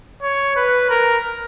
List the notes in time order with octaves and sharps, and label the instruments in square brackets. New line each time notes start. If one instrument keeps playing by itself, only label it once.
[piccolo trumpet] C#5
B4
A#4